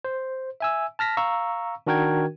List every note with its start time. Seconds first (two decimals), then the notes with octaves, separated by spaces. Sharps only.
0.05 C5
0.60 E5 G#5 E6
0.99 A5 F6 A#6 B6
1.17 F5 A#5 C#6 E6
1.87 D#3 D4 F#4 A#4 G5 G#6